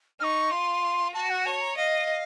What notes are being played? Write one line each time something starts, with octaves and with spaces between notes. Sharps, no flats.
D#4 C#6 F6
F4 C6
F#4 A5
F#5
C#5 A5
A#5
D#5 F5